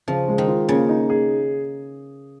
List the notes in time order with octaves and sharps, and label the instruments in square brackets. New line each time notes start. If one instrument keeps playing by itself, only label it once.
[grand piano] C#3 [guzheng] F3
[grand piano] G#3
[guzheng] D#3
[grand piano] F4
[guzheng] C#3 [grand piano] A#3
[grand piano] D#4
G#4